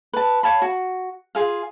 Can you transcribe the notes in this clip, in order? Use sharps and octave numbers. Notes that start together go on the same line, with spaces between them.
B4 A5
C#5 F5 A5 B5
F#4
F4 G#4 F5